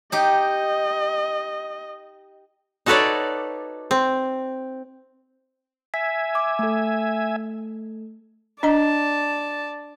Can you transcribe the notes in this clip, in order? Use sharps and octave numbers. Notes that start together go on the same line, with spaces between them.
D#4 G4 D#5
D#4 F#4 A4 B4 C#5 D5
C4
E5 G#5 B6
D6
A3 A4
D4 D5 D#5 A5 A#5